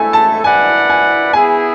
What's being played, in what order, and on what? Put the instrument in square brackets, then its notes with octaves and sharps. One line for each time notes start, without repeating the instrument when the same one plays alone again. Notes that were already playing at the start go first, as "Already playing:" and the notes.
Already playing: [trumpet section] A3 E4 A4 [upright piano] G#5
[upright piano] A5
[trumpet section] E4 B4 D5 F#5 [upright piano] G#5
[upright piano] G#5
[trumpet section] B3 E4 G#4 [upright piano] G#5